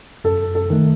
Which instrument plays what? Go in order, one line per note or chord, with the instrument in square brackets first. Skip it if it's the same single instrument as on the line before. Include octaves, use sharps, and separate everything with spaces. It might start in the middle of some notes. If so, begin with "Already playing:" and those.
[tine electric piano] F#2 [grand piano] A4
[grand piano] A4
[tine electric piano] D#3 A3